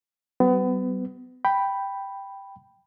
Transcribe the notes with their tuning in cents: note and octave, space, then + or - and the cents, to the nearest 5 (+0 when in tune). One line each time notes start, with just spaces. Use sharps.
G3 -40 B3 +30
G5 +0 B5 +0